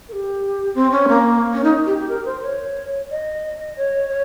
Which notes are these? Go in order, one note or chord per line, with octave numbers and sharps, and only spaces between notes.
A#4
G4
C4
C#4
A#3
C#4
D#4
G4
G4
A#4
C5
C#5
D#5
C#5
C#5